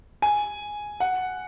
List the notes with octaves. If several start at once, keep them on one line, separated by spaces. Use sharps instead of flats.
G#5
F#5